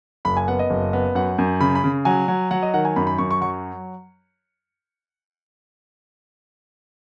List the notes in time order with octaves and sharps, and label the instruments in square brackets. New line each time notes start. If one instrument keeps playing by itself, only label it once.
[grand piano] F#1 B5
G#5
B3 F#5
D#5
F#1
B3
F#2 F#5
F#2
C#3 B5
B5
C#3
F#3 G#5
F#3
F#3 F#5
D#5
D#3 F#5
G#5
F#2 B5
B5
F#2 C#6
C#6
F#3 C#6